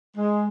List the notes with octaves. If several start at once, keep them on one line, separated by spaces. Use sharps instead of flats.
G#3